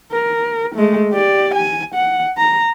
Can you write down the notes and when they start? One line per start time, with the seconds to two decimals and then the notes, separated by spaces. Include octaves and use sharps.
0.12 A#4
0.76 G#3 A3
1.13 G4 D5
1.55 G#5
1.95 F#5
2.37 A#5